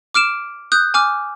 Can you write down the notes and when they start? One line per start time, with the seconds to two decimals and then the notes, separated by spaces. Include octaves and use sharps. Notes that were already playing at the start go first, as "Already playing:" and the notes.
0.14 D6 F6 D7 E7
0.72 D#6 F#6 G6
0.94 G#5 D6 F6